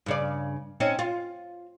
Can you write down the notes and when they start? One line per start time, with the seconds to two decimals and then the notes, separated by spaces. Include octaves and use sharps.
0.06 G2 C#3 D5
0.80 C4 C#4 D#4
0.99 F4